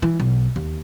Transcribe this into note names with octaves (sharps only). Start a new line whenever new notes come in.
E3
B1
D#2